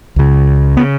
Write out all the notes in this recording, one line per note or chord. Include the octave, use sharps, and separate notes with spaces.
C#2 C#3
C#3 B3